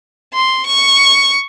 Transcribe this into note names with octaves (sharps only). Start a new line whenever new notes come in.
C6
C#6